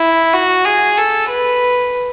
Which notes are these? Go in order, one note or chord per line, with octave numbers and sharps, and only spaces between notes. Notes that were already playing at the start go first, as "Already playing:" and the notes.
Already playing: E4
F#4
G#4
A4
B4